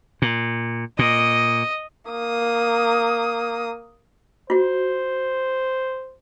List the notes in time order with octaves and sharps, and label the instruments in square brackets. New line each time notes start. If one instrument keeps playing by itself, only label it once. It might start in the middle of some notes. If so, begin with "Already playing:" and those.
[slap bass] A#2
[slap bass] A#2 [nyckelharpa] D#5
[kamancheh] A#3 D#6
[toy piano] F4 F#4 [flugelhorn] C5